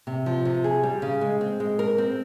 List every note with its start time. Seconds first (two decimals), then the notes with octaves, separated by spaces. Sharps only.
0.07 C3
0.26 F3
0.45 C3
0.64 G#4
0.83 G3
1.02 C#3
1.21 G#3
1.41 C4
1.60 G#3
1.79 A#4
1.98 C4